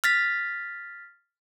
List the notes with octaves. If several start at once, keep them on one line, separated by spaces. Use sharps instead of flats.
F6 A6 B6